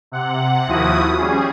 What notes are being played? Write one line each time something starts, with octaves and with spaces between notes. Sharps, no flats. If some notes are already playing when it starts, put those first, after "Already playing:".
C3 F#5
D#2 F3 E4 F#4 D#6
G3 C#4 G#4